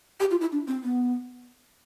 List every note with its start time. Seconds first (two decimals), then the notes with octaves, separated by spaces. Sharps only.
0.20 G4
0.31 F4
0.41 E4
0.52 D4
0.67 C4
0.83 B3